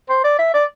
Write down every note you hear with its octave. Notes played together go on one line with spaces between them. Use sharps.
C5
D5
E5
D5